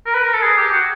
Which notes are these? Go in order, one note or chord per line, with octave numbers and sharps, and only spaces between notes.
A#4
B4
A#4
A4
G#4
G4
F#4